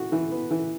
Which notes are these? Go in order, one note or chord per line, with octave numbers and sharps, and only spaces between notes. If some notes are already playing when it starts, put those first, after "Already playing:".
Already playing: E3 F#4
E3
B3
E3